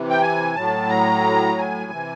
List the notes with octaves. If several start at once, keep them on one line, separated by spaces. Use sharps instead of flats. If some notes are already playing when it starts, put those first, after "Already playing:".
Already playing: C3 E3
G5
G#5
A2 F#3 A5
A#5
G#5
C3 E3